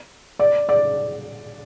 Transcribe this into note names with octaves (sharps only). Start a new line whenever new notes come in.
D5
D5